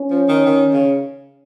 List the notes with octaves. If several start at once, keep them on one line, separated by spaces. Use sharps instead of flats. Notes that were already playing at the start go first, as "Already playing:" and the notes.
Already playing: C#4
F3
D#3
D#3
C#3